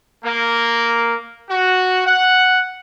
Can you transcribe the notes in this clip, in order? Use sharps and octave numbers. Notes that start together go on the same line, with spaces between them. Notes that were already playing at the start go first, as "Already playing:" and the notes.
A#3
F#4
F#5